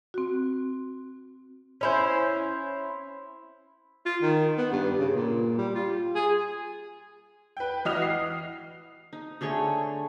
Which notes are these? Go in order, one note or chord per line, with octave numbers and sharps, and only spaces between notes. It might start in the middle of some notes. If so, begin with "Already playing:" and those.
C4 F#4
C#4 E4 C5
F4
D#3
B3
G2
C#3
A#2
G3
F4
G#4
B4 G5
E3 F#4 D#5 F6 F7
C7
D#4
D3 A3 G#4 C#5